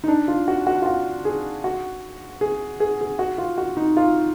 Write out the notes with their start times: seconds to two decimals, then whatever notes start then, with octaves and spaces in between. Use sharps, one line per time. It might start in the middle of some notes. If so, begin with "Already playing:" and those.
0.04 D#4
0.08 D4
0.28 F4
0.48 F#4
0.67 F#4
0.82 F4
0.86 F#4
1.25 G#4
1.64 F#4
2.41 G#4
2.80 G#4
3.01 G#4
3.19 F#4
3.38 F4
3.58 F#4
3.77 D#4
3.97 F4